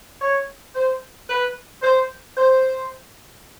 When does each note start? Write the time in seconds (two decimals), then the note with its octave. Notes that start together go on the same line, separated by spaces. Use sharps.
0.22 C#5
0.76 C5
1.29 B4
1.82 C5
2.37 C5